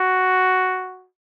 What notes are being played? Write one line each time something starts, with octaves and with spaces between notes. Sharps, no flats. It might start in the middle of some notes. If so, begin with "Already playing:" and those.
Already playing: F#4